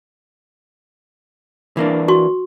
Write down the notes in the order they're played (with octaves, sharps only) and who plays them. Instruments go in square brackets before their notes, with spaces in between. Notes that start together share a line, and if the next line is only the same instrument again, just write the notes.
[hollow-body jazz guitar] E3 A#3 D4
[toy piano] F#4 C#6